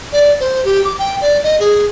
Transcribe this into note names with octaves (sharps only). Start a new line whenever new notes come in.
D5
C5
G4
D6
G5
D5
D#5
G#4